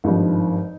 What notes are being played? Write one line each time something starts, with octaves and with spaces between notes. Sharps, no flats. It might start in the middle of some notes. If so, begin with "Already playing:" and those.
G#1 G2 F3 D#4